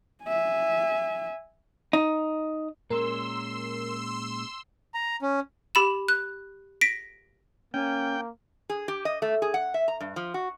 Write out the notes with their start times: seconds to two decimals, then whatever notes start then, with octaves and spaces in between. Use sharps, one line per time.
0.24 E5 G#5
1.93 D#4
2.90 A#2 G#3 C#4 A#4 C6 E6
4.94 A#5
5.22 C#4
5.75 G4 B5 E7
6.08 F#6
6.81 A#6 B6 D7
7.74 A#3 C#4 G5
8.70 G#4
8.88 G4
9.05 D#5
9.22 A3
9.42 G#4
9.54 F#5
9.74 E5
9.88 A#5
10.01 G2
10.16 F3
10.34 F#4